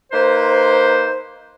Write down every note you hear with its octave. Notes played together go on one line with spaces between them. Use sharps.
A#3 D#4 B4 C5